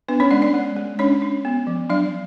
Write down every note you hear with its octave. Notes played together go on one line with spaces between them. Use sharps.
B3 D4 B4
C#4 C#5
G#3 D4 D5
D4 D5
G#3
G#3
C#4 D4 C#5
D4
B3
F3
F#3 D4 D5